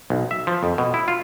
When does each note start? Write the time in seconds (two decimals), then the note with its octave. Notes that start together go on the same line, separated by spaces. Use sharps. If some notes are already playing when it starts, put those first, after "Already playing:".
0.10 B1
0.31 E5
0.47 F3
0.63 F2
0.78 B2
0.94 E4
1.08 F4